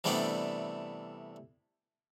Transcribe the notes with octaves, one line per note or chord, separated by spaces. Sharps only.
C3 E3 G3 A3 B3 D4